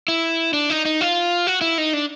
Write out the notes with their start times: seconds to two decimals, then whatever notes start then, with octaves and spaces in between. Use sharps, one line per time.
0.08 E4
0.53 D4
0.70 D#4
0.85 D#4
1.01 F4
1.47 F#4
1.61 E4
1.78 D#4
1.93 D4